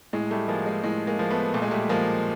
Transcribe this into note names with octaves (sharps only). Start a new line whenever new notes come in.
A2 G#3
G3 A3
F3 G#3 A#3
G#3
A2 G#3
G#3 A#3
F3 A#3
A3 B3
A#2 A3
G#3
G3 A3
F3 G#3 A#3